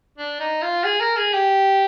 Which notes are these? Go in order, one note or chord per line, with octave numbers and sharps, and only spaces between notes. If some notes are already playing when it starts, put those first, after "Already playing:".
D4
D#4
F4
G#4
A#4
G#4
G4